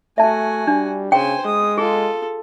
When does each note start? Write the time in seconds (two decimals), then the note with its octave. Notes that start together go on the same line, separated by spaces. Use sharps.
0.18 A3 F#4 E5 G#5 A5
0.67 G3 D4
1.12 C#3 C5 G5 G#5
1.46 G#3 D#6
1.78 F4 G#4 A4